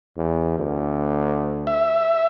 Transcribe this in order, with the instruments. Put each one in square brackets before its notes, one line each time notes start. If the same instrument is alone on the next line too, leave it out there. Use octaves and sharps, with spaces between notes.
[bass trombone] E2
D2
[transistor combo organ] E5